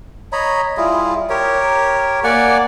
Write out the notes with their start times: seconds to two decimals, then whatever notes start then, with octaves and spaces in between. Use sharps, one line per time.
0.32 C#5 D#5 A#5 B5
0.77 G3 E4 F4 G#4
1.29 G4 A#4 C#5
2.24 A#3 D5 F#5 G#5